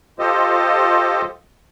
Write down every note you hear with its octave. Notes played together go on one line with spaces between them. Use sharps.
F4 G4 A4 C5 D#5